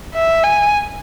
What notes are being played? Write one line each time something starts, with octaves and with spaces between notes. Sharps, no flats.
E5
G#5